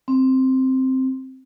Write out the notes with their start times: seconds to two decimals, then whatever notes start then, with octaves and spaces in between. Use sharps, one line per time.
0.08 C4